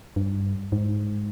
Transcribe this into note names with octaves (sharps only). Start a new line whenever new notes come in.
G2
G#2